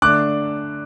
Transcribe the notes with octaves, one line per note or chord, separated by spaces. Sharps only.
D3 A3 D4 D6 F#6